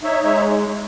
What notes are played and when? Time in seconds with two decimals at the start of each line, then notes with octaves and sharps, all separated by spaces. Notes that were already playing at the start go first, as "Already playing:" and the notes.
0.03 D#4 C#5 E5
0.23 G#3 C#5 E5